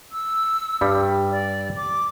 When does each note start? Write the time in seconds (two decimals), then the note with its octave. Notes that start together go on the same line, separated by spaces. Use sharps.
0.12 E6
0.81 G2 G3
1.31 D5
1.76 D6